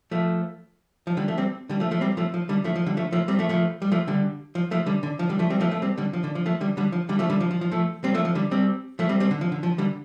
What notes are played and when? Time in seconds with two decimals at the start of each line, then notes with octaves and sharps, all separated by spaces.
0.11 F3 A3
1.07 F3
1.17 D3 G3
1.28 F3 A3
1.38 G3 C4
1.69 D3 G3
1.80 F3 A3
1.91 F3 A3
2.01 G3 C4
2.17 F3 A3
2.34 F3
2.49 D3 G3
2.64 F3 A3
2.76 F3
2.86 D3 G3
2.97 F3 A3
3.12 F3 A3
3.28 G3 C4
3.39 F3 A3
3.49 F3 A3
3.82 G3
3.92 F3 A3
4.07 D3 G3
4.55 F3
4.71 F3 A3
4.86 D3 G3
5.03 D3
5.19 F3
5.29 D3 G3
5.39 F3 A3
5.50 G3 C4
5.61 F3 A3
5.71 F3 A3
5.82 G3 C4
5.98 D3 G3
6.13 F3
6.24 D3
6.35 F3
6.46 F3 A3
6.61 D3 G3
6.77 D3 G3
6.92 F3
7.09 D3 G3
7.19 F3 A3
7.30 D3 G3
7.40 F3
7.51 F3
7.61 F3
7.71 F3 A3
8.04 G3 C4
8.14 F3 A3
8.25 F3
8.35 D3 G3
8.51 G3 C4
8.99 F3 A3
9.09 G3 C4
9.20 G3 C4
9.31 D3
9.41 F3
9.52 D3
9.63 F3
9.78 D3 G3